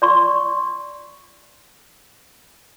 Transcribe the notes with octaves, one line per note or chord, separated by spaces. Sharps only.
D5 C6 C#6